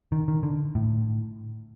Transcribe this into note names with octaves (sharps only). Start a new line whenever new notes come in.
D#3
D#3
D3
A2